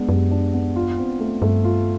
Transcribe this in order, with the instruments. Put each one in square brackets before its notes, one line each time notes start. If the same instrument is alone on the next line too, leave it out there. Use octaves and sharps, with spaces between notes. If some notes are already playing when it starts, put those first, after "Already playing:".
Already playing: [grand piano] G#3 B3 D4
[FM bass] F#2 [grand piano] G4
[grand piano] D4
B3
F4
C4
A3
[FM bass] G2 [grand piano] A3
[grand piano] F4